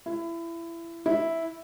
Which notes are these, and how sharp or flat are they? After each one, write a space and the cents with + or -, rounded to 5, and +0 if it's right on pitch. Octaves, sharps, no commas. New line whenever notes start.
E4 +25
E4 -5